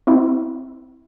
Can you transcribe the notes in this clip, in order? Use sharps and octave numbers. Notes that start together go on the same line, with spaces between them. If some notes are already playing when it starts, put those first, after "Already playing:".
C4 E4